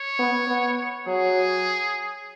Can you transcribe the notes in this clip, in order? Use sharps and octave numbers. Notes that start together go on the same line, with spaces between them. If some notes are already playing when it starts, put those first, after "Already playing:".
Already playing: C#5
B3
B3
F#3 G#4